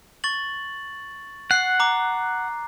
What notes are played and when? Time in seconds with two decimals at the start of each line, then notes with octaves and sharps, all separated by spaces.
0.24 C#6 A6 F#7
1.51 F#5 F#6 C7
1.80 A#5 D6